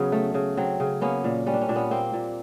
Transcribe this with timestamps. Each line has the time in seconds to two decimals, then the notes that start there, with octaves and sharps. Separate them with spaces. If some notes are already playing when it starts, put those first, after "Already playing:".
Already playing: C#3 F#3 B3 C#4
0.12 A3
0.34 C#3
0.57 F#3 C4
0.80 C#3
1.01 A#3 B3 C#4
1.24 A#2
1.46 G3 C#4
1.54 D4
1.61 C#4
1.69 A#2 D4
1.76 B3 C#4
1.91 A#3 C4
2.13 A#2